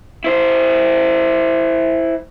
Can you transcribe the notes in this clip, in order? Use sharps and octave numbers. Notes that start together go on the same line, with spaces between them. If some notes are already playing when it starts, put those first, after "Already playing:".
E4 C5